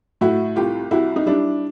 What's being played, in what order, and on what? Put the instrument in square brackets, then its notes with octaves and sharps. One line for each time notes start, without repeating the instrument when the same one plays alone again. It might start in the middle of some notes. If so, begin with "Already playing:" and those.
[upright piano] A2 E4 F#4
C2 F4 G4
C2 E4 F#4
D#4
G3 D4 E4